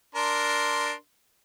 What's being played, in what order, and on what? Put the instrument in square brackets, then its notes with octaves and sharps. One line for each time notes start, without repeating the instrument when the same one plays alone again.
[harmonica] D4 A#4 C6